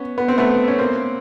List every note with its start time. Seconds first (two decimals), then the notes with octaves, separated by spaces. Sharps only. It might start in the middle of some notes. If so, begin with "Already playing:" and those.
Already playing: B3 C#4
0.18 B3
0.28 C4
0.38 A3 B3
0.68 C#4
0.79 A#3 C4